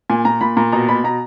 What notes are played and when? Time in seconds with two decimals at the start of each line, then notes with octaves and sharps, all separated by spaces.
0.10 A#2 G#5
0.25 A#2 A#5
0.41 A#2 B5
0.57 A#2 A#5
0.72 B2 A#5
0.89 B2 B5
1.04 B2 A#5